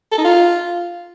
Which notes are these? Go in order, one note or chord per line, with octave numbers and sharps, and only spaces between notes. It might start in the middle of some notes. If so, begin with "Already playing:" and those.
A4
D#4
F4